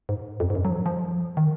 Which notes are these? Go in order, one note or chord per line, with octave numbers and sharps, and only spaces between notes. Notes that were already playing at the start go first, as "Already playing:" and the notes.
G#2
F2
G#2
F#2
F#3
F3
F3
D#3